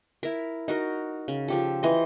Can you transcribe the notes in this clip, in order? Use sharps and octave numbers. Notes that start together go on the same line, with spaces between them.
E4 A#4
D#4 F#4 A#4
C#3
F3 G4 A4
E3 C5 D#5